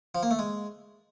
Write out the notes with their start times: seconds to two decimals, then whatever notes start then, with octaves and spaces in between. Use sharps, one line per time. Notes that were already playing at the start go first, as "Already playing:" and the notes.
0.15 F3
0.23 A#3
0.31 A3
0.39 G#3